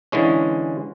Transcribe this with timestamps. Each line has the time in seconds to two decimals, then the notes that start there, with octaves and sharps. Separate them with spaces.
0.12 D3 E3 G#3 C#4